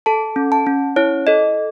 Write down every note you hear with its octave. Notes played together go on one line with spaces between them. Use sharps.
A4 A5
C#4
A5
C#4
E4 C#5
A4 D#5